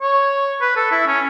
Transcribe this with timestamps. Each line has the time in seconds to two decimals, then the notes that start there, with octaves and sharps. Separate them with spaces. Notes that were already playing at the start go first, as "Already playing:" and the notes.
0.02 C#5
0.61 B4
0.76 A4
0.91 E4
1.07 C#4